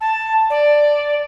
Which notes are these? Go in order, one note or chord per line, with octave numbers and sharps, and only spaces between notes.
A5
D5